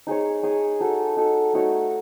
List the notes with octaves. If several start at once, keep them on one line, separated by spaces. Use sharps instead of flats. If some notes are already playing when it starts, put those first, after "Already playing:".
D#4 G#4 C#5
D#4 G#4 C#5
D#4 F#4 A4
D#4 F#4 A4
A3 D#4 F#4 C#5